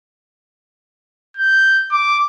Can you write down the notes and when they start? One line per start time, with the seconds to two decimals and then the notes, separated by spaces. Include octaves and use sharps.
1.37 G6
1.91 D6